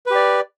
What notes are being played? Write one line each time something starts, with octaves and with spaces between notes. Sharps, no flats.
G4 B4 D5